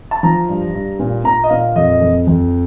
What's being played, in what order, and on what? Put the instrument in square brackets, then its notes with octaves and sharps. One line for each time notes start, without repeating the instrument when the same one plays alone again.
[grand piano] A5
F3 A#5
G2
G2
A#2
A#2 A#5
D#5
A#2 F5
F2 D#5
F2
F2